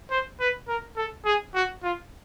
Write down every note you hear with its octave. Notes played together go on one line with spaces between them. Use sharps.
C5
B4
A#4
A4
G#4
F#4
F4